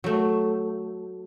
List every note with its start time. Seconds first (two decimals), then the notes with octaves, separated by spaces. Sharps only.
0.04 F#3 A3